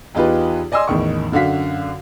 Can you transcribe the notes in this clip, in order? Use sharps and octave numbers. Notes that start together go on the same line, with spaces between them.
E2 D#4 F4 G4 B4
D5 D#5 G#5 C6 E6
A1 E2 D#3 C#6
F#2 D3 F#4 F5 B6